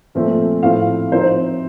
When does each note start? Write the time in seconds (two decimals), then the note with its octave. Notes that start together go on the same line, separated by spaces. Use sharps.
0.15 A#2 F3 A3 C4
0.63 A2 F3 C4 F5
1.11 F3 C4 D#4 C5